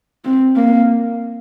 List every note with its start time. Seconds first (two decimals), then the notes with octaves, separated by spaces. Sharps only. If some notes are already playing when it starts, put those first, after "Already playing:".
0.25 C4
0.56 A#3